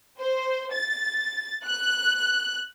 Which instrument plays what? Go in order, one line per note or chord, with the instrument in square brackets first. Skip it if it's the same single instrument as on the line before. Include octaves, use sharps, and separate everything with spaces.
[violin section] C5
A6
F#6